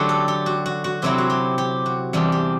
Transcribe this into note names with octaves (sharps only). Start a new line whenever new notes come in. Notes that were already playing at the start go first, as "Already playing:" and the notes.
Already playing: D3 F#3 A3 G4
A4
G4
F#4
F#4
F#4
C3 F#3 C4 E4 G4
F#4
G4
G4
F#4
E2 C3 G3 D4 G4
G4